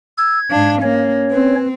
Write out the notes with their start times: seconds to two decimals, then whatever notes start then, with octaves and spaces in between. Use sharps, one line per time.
0.18 E6 G#6
0.51 G#2 D4 F5
0.82 A#3 C#4 C#5
1.31 C4 B4